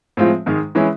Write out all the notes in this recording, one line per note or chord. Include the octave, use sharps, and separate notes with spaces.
A2 F3 G#3 C4 F4
G#2 D#3 G#3
E3 G#3 C#4 E4